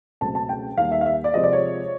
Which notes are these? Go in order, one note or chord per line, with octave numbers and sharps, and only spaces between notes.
C#2 B2 F#3 A3 C4 A5
A5
G5
D#2 D#3 G3 A#3 F5
E5
F5
E5
D5
C3 F3 G#3 D#5
D5
C#5